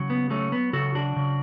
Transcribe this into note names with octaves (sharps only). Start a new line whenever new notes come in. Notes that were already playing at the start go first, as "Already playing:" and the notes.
Already playing: C#3 F#3
B3
F#3 A3 C#4
B3
C#3 F#4 A4
D4 F#4
C#3